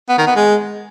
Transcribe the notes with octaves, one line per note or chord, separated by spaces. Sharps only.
B3
D#3
B3
G#3